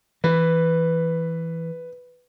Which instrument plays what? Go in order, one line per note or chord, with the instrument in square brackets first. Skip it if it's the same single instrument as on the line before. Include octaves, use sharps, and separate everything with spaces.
[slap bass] E3 [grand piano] B4